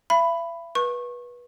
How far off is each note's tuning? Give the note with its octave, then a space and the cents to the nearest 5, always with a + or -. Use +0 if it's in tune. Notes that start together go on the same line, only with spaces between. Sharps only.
E5 +40 B5 +5
B4 -25 C#6 -25